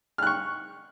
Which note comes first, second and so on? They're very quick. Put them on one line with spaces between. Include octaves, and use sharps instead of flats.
F6 F#6 C#6